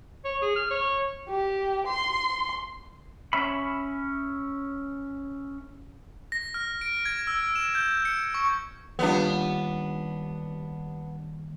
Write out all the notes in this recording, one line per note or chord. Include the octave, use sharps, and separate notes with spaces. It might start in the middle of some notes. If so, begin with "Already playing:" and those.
C#5
G#4
F6
C#5
G4
C6
C#4 E5 B5
A#6
F6
D7
G#6
E6
E7
G6
C#7
C#6
D#2 G3 B3 D4 F4